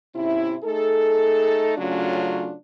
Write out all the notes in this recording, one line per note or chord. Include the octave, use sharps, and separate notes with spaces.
G#2 C3 C#4 E4
A3 D#4 G#4 A4
C#3 F#3 A3 C#4 D4 F4